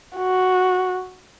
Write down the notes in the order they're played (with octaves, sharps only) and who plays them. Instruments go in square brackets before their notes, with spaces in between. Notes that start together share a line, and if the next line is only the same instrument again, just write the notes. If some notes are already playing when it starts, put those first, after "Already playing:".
[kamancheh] F#4